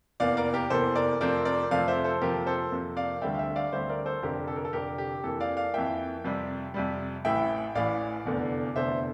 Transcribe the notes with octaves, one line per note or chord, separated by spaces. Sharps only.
F1 E2 E3 A#3 D5 F5
A#4 D5
G4 A#4
F1 E2 E3 A#3 A4 C5
A#4 D5
F2 C3 F3 A3 C4 A#4 D5
A#4 D5
F2 C3 F3 A3 C4 D5 F5
C5 E5
A4 C5
F2 C3 F3 A#3 G4 A#4
A4 C5
F2 C3 F3 A#3
D5 F5
D2 D3 G3 C4 E5 G5
F5
E5 G5
D5 F5
D2 D3 G3 C4 C5 E5
A#4 D5
A4 C5
F1 F2 D3 G4 A#4
A4
A#4
A4
F1 F2 D3 G4 A#4
G4
F2 E3 A#3 A4
D5 F5
D5 F5
F2 E3 A#3 E5 G5
F2 C3 G3
F2 C3 G3
A1 A2 E3 E5 G5
A1 A2 E3 D5 F5
F1 E2 D3 A3
F1 E2 D3 A3 C5 E5